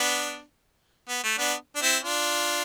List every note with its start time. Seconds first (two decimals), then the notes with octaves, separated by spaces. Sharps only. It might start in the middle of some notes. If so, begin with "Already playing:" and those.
Already playing: B3 D4
1.09 B3
1.24 A3
1.38 B3 D4
1.76 D4
1.82 C4 E4
2.03 D4 F4